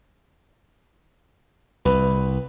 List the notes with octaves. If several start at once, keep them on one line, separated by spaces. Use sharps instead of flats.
C2 B4